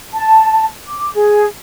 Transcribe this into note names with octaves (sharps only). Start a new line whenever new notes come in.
A5
D6
G#4